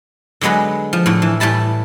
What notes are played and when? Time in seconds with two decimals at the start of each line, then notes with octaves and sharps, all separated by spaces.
0.41 D3 F#3 G#3 B3 B4
0.93 F3
1.06 A2 D3
1.22 E3
1.40 A2 G3 E5 A5 B5